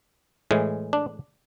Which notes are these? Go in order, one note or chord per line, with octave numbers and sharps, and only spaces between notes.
A2 E3 G#3
D4